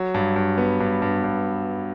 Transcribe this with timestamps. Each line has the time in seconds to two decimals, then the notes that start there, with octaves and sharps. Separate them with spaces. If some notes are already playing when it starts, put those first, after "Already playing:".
Already playing: F#3
0.14 G2
0.36 G2
0.58 B3
0.80 G2
1.02 G2
1.24 G2